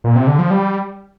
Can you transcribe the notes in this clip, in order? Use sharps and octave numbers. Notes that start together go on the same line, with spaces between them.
A#2
C3
D3
F3
G3